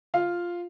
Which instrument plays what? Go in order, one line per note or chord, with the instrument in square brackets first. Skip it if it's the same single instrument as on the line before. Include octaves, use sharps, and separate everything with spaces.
[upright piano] F4 F5